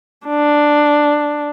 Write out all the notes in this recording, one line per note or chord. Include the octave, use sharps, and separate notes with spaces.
D4